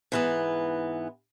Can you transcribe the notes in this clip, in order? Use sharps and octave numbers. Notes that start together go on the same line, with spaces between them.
G#2 E3 B3